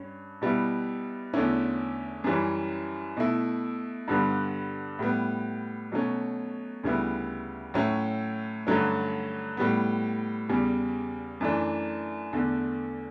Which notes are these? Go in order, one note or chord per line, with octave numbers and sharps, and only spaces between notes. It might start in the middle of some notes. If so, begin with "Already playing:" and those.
Already playing: G2 C#4
B2 G3 B3 E4
E2 D3 A3 C#4 E4
F#2 E3 G3 C#4
B2 A3 E4
G2 D3 G3 B3
A2 G3 B3
B2 F#3 A3 C#4
D2 C#3 G3 B3 E4
A2 F#3 C#4 E4
G2 D3 F#3 A3 C#4
A2 G3 B3
E2 C#3 G3
F#2 E3 A3 D4
E2 D3 A3